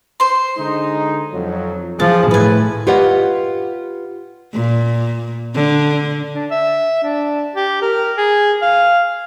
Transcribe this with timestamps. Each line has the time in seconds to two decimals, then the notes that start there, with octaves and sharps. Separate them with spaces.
0.20 C5 C6
0.57 D3 G#3 D#4
1.32 F2 F#3
2.00 E3 F3 G#4 A5
2.31 A2 B4 G#5
2.87 F4 G4 B4 C#5 D#5 F#5
4.53 A#2
5.54 D3
6.35 D4
6.51 E5
7.03 D4
7.56 G4
7.82 A#4
8.17 G#4
8.62 F5